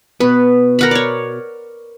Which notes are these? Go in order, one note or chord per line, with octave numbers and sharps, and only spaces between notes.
B2 B3 B4
A#4 F#5 B5
C#5 D5